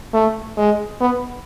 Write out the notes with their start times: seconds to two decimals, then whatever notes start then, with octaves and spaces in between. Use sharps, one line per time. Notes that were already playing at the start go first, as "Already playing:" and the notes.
0.13 A3
0.57 G#3
1.00 B3